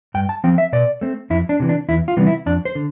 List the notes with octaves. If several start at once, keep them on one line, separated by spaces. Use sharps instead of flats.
G2 G5
A5
F3 C4 G5
E5
B2 D5
A3 C4
F2 E4
D4
C3 E3
D4
E2 E4
F4
C3 E3 G3 B3
E4
F2 D4
C5
D3